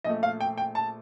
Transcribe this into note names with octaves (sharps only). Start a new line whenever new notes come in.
A#1 A#2 A3 D#5
F5
G5
G5
A5